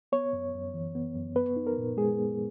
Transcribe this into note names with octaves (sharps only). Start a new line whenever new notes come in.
B3 C#5
F#2
F#2
E3
B3
F#2
B3 B4
D#4
A#4
A#2
G#3 G#4
B3